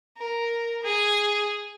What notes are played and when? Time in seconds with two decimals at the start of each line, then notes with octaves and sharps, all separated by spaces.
0.17 A#4
0.82 G#4